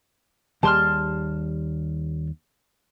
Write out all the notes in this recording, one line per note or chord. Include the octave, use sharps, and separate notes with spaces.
D#2 G3 G#4 A5 C6 F6